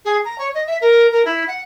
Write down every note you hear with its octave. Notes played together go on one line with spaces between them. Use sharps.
G#4
A#5
C#5
D#5
E5
A#4
A#4
E4
F#5